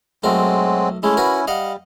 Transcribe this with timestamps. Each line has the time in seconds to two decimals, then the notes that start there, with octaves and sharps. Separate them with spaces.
0.24 B1 F#3 G#3 A3 C4 A#4
1.03 G#3 A3 C#4 E4
1.17 F#4 A#4 B4
1.48 G3 D#5 F5 F#5